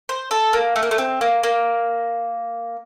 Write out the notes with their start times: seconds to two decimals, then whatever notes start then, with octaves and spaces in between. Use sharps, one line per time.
0.09 C5
0.31 A4
0.53 A#3
0.76 A3
0.83 A#3
0.91 A3
0.98 C4
1.21 A#3
1.43 A#3